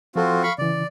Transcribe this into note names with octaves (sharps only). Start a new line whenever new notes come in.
F3 C4 F4 F#4 A4
F5 B5 C#6
C#3 E3 D5